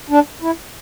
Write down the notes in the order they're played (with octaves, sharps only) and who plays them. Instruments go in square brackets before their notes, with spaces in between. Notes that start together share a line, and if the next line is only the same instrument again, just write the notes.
[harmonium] D4
E4